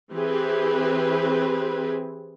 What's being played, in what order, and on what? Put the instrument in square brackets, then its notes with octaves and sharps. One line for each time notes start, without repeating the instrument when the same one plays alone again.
[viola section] E3 C4 G4 G#4 B4